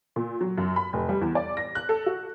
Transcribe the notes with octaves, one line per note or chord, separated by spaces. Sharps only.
A#2
F#3
F#2
B5
F1
G3
E2
D5
A#6
F#6
A4
F#4